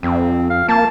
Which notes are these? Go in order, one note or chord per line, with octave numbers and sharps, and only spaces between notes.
F2 C4
F5
A#3 A5